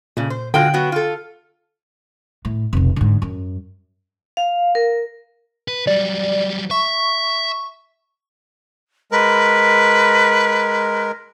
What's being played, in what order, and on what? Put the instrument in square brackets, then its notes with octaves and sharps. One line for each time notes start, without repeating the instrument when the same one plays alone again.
[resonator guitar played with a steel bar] F2 C#3 [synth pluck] A#2
[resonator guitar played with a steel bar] C5
[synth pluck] D3 F5 [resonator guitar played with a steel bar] G#3 F4 F#4 [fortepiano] G5
[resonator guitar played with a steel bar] F#3 B3 F#4
F4 A4
[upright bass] A2
F1 B1
G#2 D3
F#2
[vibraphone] F5
A#4
[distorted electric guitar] B4
[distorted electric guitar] F#3 G3 [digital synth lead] D5
[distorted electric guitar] E5 [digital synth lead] C#6
[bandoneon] G#3 A#4 [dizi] B4